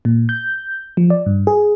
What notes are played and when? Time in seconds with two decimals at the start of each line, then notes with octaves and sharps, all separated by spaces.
0.05 A#2
0.29 G6
0.97 F3
1.10 D5
1.26 G2
1.47 G#4